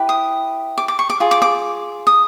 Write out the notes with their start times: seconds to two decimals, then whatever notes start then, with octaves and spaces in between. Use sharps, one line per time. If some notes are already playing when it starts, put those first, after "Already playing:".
Already playing: E4 G4 B4
0.09 D#6
0.78 D6
0.88 D6
0.99 C#6
1.10 D6
1.20 F4 G#4
1.31 D6
1.42 D6
2.07 D#6